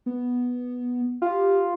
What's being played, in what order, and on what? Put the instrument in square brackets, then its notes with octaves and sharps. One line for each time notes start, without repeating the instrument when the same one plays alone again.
[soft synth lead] B3
[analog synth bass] F4 [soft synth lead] G4